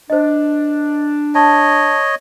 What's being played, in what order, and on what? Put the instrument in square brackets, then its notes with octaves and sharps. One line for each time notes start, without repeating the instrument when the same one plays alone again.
[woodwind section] D4 [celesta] C5 D#5
[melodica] C#5 D#5 [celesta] A5